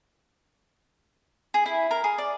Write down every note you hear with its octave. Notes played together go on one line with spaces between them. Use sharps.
G#4
E4
A#4
G#4
D5